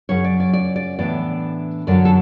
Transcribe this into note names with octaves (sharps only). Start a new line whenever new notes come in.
F#2 C#3 F#3 C#4 C#5
D5
D5
D5
D5
A2 E3 B3 D4 D5
F#2 D3 F#3 D5
A4